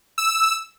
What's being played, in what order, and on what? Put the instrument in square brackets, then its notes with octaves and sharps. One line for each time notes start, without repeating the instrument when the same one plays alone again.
[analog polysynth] E6